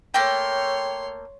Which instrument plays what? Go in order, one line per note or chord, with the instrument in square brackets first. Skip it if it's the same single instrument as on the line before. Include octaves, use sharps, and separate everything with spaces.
[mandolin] A3 A#3 G5 [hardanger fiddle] C#5 C6